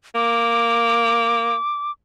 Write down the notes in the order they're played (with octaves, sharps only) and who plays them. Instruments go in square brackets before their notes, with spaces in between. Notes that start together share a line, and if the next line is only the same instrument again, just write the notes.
[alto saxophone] A#3 [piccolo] D6